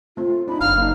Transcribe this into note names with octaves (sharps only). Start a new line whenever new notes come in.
A3 C4 F4
D4 D#4 B5
F#1 F5 F6
A#3 D#4